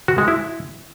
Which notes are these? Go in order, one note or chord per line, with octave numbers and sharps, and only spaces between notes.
F#4
G#3
E4